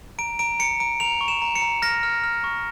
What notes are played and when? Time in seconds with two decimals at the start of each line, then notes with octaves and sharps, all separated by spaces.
0.19 A#5 D7
0.39 A#5 D7
0.59 A#5 C#7
0.80 A#5 D7
1.00 A#5 F7
1.21 C#6
1.28 E7
1.42 A#5
1.56 C#7
1.62 A#5
1.82 F6 A#6
2.03 F6
2.23 F6
2.44 C#6